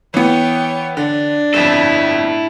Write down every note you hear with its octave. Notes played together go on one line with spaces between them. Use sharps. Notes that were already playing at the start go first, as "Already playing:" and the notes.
E3 B3 C#5 G5
D3 D4
G1 F2 E4 A4